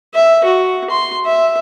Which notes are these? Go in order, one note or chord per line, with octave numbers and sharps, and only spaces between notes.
E5
F#4
C6
E5